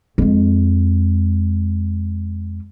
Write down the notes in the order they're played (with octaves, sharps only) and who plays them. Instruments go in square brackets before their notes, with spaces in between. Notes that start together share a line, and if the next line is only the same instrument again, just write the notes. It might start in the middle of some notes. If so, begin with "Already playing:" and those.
[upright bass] F2 G#3